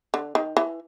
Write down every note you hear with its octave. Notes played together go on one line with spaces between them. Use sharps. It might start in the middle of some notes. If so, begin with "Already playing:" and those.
D3
D#3
E3